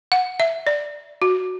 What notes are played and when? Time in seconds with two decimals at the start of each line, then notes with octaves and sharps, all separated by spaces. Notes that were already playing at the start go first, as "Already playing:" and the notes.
0.12 F#5
0.40 E5
0.67 D5
1.22 F#4